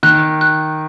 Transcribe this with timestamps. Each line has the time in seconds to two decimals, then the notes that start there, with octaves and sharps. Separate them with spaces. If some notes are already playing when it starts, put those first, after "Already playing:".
0.03 D#3 F#6
0.41 F#6